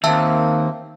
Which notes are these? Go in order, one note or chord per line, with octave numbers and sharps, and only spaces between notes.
D#2 A#3 C4 E5 A5 E6